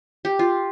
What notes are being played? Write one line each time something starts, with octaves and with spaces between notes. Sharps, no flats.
G4
F4